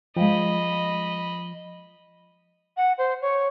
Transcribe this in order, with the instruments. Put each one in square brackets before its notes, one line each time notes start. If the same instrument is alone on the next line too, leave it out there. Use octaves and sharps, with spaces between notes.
[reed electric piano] F3 [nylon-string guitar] G#3 F5 G5 [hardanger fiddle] D#5 B5
[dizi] F#5
C5
C#5